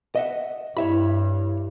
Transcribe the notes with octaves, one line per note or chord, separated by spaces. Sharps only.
D#5 E5 F#5
G2 E4 G4 C#5 E5 B5